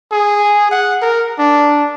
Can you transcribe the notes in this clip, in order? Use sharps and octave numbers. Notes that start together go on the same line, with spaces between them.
G#4
F#5
A#4
D4